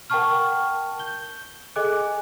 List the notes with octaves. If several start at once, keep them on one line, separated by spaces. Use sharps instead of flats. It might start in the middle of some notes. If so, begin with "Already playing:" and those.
A#4 F#5 G5 A5 C#6 F6
G6 G7
G#4 A4 D#5 G#5 D6 F#6